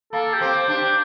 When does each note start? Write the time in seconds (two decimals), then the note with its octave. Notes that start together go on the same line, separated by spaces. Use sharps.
0.13 A#3 A4
0.34 G4
0.41 C4
0.68 D4
0.75 G4